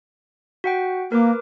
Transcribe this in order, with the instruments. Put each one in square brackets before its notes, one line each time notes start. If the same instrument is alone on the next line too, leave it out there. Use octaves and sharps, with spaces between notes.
[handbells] F#4 F#5 G5
[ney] A#3 [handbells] A#4 B4 D6